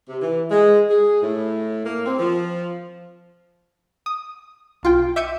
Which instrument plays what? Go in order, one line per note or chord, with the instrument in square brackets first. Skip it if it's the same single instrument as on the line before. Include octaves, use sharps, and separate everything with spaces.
[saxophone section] C3
E3
G#3
G#4
A2
A#3
C4
F3
[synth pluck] D#6
B1 F4 G5
E5 D6 G6 C#7 D#7